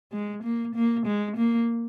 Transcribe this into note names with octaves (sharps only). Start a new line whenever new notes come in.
G#3
A#3
A#3
G#3
A#3